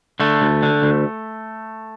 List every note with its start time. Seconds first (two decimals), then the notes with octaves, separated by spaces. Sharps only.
0.20 D3 A3
0.42 D2
0.63 D3
0.82 D2